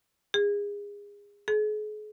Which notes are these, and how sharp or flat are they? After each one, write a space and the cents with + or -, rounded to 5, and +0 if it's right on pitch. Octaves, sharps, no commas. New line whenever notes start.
G#4 -30
G#4 +40